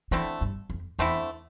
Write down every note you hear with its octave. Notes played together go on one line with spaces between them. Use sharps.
D3 E3 A3 C4 E4
G2
F2
E2 D3 A3 C4 E4